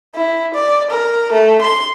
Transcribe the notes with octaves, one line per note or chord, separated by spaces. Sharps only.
E4
D5
A#4
A3
C6